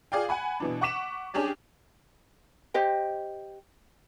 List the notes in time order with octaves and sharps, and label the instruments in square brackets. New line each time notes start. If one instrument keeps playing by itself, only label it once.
[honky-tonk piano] F4 G#4 D5 F5 G5
F#5 G#5 B5
B2 E3 D4
F#5 C#6 D6 B6 E7
C#4 D4 G4 G#4 D5
[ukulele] G4 C5 D#5 G5